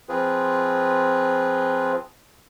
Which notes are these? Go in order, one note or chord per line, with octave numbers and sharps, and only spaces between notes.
F3 C4 F4 G#4 B4